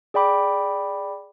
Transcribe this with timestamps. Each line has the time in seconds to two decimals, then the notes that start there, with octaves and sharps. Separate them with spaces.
0.14 G#4 D5 G5 B5 D6